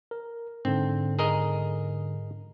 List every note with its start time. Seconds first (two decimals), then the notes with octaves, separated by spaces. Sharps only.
0.11 A#4
0.65 G#2 D3 C4
1.19 G#4 A#4 D#5